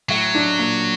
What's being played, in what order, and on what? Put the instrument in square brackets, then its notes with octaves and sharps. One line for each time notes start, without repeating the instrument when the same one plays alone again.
[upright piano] A2 [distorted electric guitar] F#3
[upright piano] D4
A#2